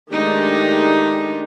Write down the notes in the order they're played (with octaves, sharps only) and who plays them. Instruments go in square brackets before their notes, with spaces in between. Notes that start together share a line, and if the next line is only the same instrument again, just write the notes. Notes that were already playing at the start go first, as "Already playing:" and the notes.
[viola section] D#3 G#3 A3 D4 D#4 G4